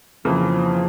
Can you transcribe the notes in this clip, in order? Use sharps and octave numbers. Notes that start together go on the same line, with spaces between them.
F2 C#3 E3 F3 A#3